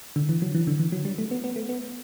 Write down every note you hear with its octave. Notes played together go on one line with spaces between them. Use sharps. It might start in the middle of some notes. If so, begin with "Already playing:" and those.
D3
E3
F#3
E3
D3
E3
F#3
G3
A3
B3
B3
A3
B3